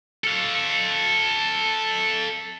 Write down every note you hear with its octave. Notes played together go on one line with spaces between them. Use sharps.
A4 F5